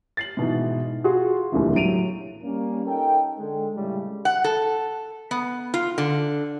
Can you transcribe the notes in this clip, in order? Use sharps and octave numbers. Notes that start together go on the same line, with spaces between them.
A6 C7 F#7
G#2 B2 E3
F4 F#4 G#4 F#5 C6
D#1 C#2 A#2 D3 E3
A2 F#3 D7 D#7 F7
G3 A#3 C#4
C#4 D#4 A4 A#4 G5
D3 G#3 A4
A2 C#3 G3 G#3
F#5
A4
B3
F4
D3